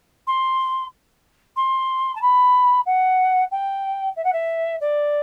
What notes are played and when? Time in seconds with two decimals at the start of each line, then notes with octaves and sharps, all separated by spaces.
0.27 C6
1.56 C6
2.15 A5
2.22 B5
2.86 F#5
3.51 G5
4.16 E5
4.24 F#5
4.33 E5
4.81 D5